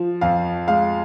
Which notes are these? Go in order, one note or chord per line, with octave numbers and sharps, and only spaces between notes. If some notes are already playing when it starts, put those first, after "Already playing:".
Already playing: F3
F2 F5
G#3 F5